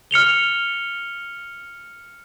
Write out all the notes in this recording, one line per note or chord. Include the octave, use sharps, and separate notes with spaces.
F6 C#7 F7 G7